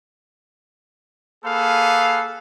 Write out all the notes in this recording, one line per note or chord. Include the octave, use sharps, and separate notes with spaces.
A#3 G#4 A4 B4 F5